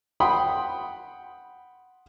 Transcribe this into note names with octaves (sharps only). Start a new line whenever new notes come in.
F#5 G5 B5 C6 D#6